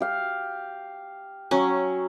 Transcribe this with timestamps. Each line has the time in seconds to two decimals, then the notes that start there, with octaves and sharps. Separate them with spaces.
0.01 G4 F5
1.51 F#3 C#4